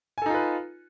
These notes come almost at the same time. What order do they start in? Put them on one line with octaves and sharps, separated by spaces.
G#5 A4 D#4 F4 B4